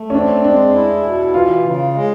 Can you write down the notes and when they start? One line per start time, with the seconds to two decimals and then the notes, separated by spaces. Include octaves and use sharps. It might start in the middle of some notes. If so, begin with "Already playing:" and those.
Already playing: A3
0.10 C#4
0.14 C4 D4
0.44 G#3 D4
0.74 E4
1.03 B2
1.33 E3 F4
1.64 C#3
1.94 G#3